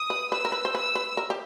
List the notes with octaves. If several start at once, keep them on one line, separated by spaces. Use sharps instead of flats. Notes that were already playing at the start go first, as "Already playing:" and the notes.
Already playing: D#6
B4
B4 E6
A#4
B4
C5
B4 E6
B4
A#4
G4